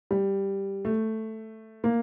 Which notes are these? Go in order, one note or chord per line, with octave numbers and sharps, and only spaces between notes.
G3
A3
A#3